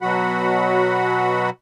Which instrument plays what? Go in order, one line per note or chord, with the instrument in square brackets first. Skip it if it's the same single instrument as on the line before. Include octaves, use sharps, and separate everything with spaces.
[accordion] B2 F#3 F#4 F#5 B5